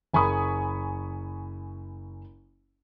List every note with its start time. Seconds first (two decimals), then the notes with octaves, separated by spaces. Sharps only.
0.13 F#1 G#5 B5 C#6 D#6